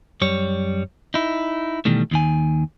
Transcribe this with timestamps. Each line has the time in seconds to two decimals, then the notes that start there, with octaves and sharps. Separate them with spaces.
0.21 F#2 G3 C#5
1.14 D#4 E4
1.85 B2 D#3 E3 G3 A3
2.11 D#2 D#3 G#5